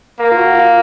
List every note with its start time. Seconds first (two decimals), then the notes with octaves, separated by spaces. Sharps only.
0.19 A#3 A#4
0.32 F4
0.38 F#4
0.55 F4